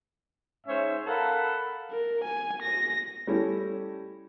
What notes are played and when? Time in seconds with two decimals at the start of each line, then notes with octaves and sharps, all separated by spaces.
0.67 G#2 C#4 C5 C#5 E5
1.07 A4 A#4 F5 F#5 B5
1.91 A#4
2.24 G#5
2.62 A#6
3.27 G3 A3 C#4 E4